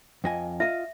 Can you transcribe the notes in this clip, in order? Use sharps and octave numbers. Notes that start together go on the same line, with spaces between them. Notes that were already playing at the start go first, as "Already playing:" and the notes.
F2 D#5 G#5
F4 D#5 E5